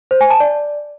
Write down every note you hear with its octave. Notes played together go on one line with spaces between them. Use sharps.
C5
G#5
A5
D5